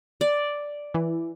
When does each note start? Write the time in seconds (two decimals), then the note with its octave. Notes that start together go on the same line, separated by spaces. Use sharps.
0.21 D5
0.94 E3